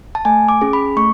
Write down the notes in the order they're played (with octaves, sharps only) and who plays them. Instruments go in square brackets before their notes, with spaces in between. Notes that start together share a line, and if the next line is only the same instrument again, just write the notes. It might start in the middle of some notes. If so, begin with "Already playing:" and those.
[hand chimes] A5
A3 G#5
D6
C#4 G#4
B5
A3 C#6